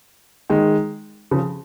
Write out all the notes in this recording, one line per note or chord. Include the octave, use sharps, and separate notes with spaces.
D#3 G#3
C#3 F3